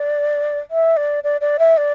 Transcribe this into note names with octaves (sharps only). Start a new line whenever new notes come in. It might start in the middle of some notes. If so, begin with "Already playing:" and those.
Already playing: D5
E5
D5
D5
D5
E5
D5